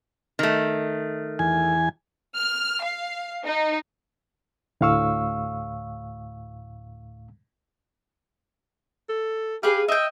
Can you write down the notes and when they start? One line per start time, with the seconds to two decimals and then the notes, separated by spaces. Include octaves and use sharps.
0.39 D#3 A3
1.39 E2 G#5
2.34 F6
2.83 F5
3.44 D#4
4.81 D2 A2 F5 C#6 E6
9.09 A4
9.63 G4 G#4 B4 F5
9.88 D#5 E5 G5